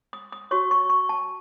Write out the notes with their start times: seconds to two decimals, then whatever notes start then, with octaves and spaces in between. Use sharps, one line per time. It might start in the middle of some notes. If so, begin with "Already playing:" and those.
0.13 D#6
0.32 D#6
0.51 F#4 C#5 C#6
0.71 C#6
0.90 C#6
1.09 A5